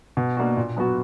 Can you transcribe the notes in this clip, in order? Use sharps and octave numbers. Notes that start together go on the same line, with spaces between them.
B2
A#3 D4 F#4
A#2
F#3 B3 F#4